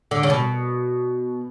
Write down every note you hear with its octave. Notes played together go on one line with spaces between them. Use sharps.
D3
C#3
B2